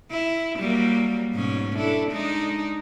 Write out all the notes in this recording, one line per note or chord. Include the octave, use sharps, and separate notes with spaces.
E4
F#3 G3 A#3
G#2 B2 C#4
D4 E4 A4
G#3 D4 D#4